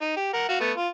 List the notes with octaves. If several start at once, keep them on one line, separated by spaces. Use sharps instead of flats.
D#4
G4
A#4 F#5
F#4 F5
A3 B3
F4